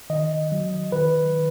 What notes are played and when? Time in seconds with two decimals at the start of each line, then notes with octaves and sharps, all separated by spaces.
0.10 D#3 D#5
0.52 F#3
0.92 D#3 B4
1.34 D#3